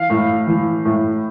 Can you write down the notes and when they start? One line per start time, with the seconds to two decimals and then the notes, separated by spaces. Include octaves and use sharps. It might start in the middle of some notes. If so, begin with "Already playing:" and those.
Already playing: E3 F5
0.10 A2
0.47 E3
0.85 A2